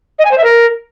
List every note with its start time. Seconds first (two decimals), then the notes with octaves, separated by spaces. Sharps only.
0.19 D#5
0.25 G#5
0.31 C5
0.38 E5
0.44 A#4